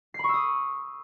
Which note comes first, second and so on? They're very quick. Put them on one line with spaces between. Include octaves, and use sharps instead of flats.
C7 B5 C#6 E6 D#6